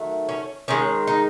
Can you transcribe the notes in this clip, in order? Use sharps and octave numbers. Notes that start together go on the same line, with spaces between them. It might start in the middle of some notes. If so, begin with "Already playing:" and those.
Already playing: D#3 F#3 A3
C#4
D#3 G#3 C#4
D#4